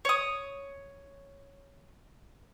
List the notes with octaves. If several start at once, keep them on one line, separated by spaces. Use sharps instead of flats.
C#5 D#6